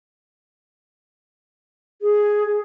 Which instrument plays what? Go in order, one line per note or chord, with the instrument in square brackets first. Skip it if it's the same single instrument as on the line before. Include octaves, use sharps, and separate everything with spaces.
[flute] G#4